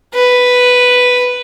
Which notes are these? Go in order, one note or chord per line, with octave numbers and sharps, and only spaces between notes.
B4